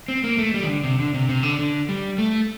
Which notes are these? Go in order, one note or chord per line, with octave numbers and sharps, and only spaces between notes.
C4
A#3
A3
G3
D#3
D3
C3
D3
C3
C3
D3
D3
G3
A3